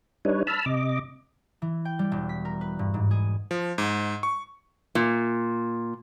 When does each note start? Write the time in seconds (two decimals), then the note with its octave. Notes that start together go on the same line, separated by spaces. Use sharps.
0.25 G3 D4 D#4 B4 C#5
0.47 A5 B5 E6 F6
0.66 C3 D#5 D6
1.62 E3
1.85 G5
1.99 G3
2.12 E1
2.29 B6
2.45 A#4
2.61 B4
2.79 G2
2.94 G#2
3.11 G#4
3.51 F3
3.78 G#2
4.23 C#6
4.95 A#2